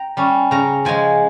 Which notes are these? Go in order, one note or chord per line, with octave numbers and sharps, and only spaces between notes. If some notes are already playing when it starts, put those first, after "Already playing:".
Already playing: G5 A#5
G3 C#4
C#3 A#5
F3 G#3 G#5